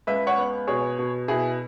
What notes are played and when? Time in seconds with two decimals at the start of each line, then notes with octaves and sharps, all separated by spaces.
0.07 C#2 B4 E5
0.27 C#5 F#5
0.38 B3
0.67 B2 G#4 C#5
0.98 B2
1.28 B2 E4 G#4